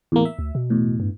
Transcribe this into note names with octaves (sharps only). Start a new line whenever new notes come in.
E2 A2 A#3
E5
D2
B2
E2 A2
G2